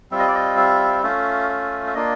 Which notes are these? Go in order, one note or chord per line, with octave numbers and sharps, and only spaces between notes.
G3 C4 F4 E5
D#5
D5
D#5
E5
A3 C#4 F4 E5
E5
E5
A#3 D4 F4 D#5